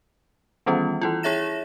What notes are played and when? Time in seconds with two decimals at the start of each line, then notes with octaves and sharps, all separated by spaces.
0.66 D#3 E3 G3 B3 C#4 F4
1.02 E3 E4 F4
1.23 E4 G#4 C#5 E5 A#6 E7